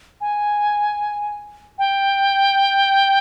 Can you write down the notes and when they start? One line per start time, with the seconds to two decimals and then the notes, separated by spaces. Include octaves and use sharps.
0.21 G#5
1.79 G5